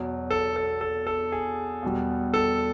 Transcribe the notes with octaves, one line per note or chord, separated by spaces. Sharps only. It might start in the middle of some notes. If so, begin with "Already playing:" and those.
Already playing: E2 B2 F#3
A4
A4
A4
A4
G#4
E2 B2 G3
A4